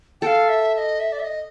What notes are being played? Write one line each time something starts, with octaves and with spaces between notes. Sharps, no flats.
A4 F5 G5
E5
E5
D#5
E5
D5
E5
D#5